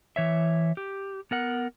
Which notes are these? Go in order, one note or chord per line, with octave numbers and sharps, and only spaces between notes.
E3 C#5 E5
G4
B3 A#4 F#5